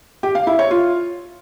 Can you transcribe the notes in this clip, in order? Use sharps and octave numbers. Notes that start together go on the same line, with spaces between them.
G4
F5
E4
C#5
F4